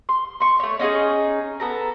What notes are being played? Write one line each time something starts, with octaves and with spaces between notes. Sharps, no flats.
C6
C6 C#6
A3 C#5
C#4 D#4 F4 G#4
B3 A4 A#5